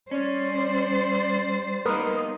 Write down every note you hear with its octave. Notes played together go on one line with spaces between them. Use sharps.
G3 C#4 C5 D5
A#3 B3 D#4 A#4 B4 D#6